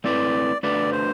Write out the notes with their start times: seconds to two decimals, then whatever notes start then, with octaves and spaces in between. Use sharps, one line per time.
0.04 A3 C4 E4 B4 D5
0.63 A3 D4 F#4 B4 D5
0.92 C5